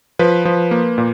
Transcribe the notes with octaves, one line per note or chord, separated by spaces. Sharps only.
F3 B4
F3
A#3
A#2